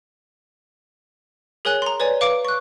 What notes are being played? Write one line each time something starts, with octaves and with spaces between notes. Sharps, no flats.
G#4 A#4 C#5 G#5 F#6
A#5 C6
B4 C#5 D5 G#5
B4 F5 D6 D7
C#6 F#6